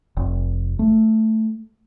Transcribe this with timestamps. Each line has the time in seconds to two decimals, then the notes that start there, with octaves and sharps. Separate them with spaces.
0.17 F1
0.79 A3